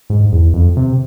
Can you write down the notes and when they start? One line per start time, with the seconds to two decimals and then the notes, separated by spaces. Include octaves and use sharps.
0.10 G#2
0.32 E2
0.54 F2
0.77 C3